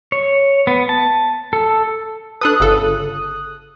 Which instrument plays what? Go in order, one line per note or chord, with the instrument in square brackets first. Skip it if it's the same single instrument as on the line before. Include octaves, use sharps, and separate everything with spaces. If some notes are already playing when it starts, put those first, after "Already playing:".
[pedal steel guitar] C#5
B3
A5
A4
[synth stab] D4 A4 B4 [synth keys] D#6 F#6
[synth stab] G1 C#3 A4